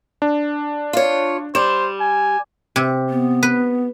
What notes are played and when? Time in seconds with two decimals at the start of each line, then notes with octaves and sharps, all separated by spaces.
0.22 D4
0.93 F4 C#5
1.55 G3 C5 E7
2.00 G#5
2.76 C3
3.10 B3
3.43 B4